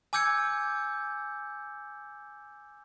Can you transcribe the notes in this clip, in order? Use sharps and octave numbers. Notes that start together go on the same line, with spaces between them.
G#5 D6 E6 G6 G#6 C#7